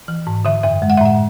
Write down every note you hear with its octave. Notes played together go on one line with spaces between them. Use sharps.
E3
G#2
D3 E5
F#2 E5
G#3
F#5
E5
A2 F#5